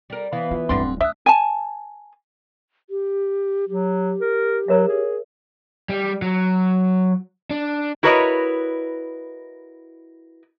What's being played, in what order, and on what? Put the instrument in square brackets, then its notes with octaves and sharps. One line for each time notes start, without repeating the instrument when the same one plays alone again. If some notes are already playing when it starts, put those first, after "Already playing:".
[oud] G3 A#4
[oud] E3 B3 E4 [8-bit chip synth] F5
[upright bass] F4
[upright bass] D1 G2 [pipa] D3 D4 C6 [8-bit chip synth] C4
[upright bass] D4 [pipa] E5 [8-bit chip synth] D#6 E6 F#6
[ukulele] G#5 A5
[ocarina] G4
[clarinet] F#3 [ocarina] G4
[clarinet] A#4
[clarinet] F#3 [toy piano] A#4 C#5 E5
[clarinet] G#4
[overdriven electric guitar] G3
F#3
D4
[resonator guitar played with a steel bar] E4 F#4 A#4 B4 C#5 D#5